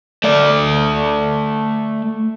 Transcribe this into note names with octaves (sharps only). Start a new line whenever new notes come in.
A3 D5